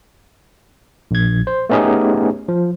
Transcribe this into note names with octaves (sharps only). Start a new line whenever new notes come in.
A#1 G#6
C5
A3 B3 C#4 D#4 G4 G#4
F3